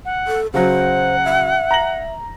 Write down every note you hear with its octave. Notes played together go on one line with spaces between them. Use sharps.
F#5
A4
C#3 F#3 C5 F#5
E5
A#5 A#6 F#7